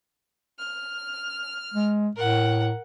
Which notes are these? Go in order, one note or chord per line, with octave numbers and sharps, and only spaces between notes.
F6
G#3
A2 A#4 F#5